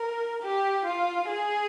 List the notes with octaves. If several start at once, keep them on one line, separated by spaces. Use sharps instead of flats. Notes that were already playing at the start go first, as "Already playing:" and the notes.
Already playing: A#4
G4
F4
G#4